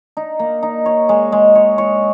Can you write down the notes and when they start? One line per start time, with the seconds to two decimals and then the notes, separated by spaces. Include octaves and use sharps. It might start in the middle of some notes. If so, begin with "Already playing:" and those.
0.17 D#4
0.39 A#3
0.63 D#4
0.86 C#5
1.09 G#3
1.32 G#3
1.55 C#5
1.78 C#5